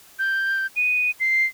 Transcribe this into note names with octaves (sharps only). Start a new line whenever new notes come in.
G6
D#7
C7